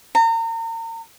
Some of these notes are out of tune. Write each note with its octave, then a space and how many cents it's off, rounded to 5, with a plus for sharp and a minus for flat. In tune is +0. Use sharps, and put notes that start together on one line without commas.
A#5 -35